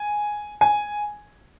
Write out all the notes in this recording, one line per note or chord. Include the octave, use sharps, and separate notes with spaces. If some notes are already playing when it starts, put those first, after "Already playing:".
Already playing: G#5
G#5